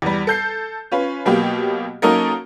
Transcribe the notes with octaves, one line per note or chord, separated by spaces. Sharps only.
E2 G3
A4 G6 C7
C#4 F4 B4
B2 F#3 A#3 B3 G4
F#3 A#3 C#4 D#4 A4 A#4